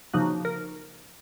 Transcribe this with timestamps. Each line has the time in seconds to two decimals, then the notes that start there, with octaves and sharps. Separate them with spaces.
0.13 C#3 F3 A#3 D#4 F#4
0.45 A#4